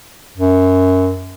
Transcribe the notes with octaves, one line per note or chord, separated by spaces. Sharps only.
F#2